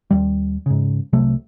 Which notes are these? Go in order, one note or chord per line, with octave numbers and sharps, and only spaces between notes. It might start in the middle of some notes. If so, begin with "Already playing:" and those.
D#2 G3
G#2 C#3
C2 C3 F#3 A3